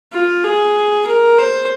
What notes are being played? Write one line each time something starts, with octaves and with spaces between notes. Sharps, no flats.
F4
G#4
A#4
C5